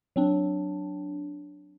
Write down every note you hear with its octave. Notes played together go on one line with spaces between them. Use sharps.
F#3 C4 D4